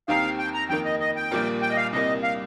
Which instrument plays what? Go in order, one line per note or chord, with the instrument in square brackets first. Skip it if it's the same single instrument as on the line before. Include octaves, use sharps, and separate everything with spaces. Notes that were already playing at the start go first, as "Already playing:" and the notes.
[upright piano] D#2 D#3 C4 G4 A#4 [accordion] F5
[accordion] G5
A#5
[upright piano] F2 D#3 A#3 [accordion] G5
[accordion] D#5
D#5
G5
[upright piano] A#1 A#2 G3 A#3 F4
[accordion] G5
D#5
F5
[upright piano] C2 C3 G3 A#3 [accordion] D#5
[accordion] F5